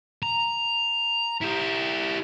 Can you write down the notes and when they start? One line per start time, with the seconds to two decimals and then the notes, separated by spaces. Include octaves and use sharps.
0.23 A#5
1.42 E4 G4